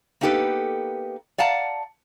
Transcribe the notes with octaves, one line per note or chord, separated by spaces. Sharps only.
A#3 B3 D#4 G4 A4 B4
D5 F5 F#5 A5 A#5